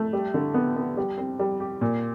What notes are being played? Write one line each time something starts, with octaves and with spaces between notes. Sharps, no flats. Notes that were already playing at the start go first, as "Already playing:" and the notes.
Already playing: A3
G3
D3
B3
B3
G3
C4
G3
G4
A#2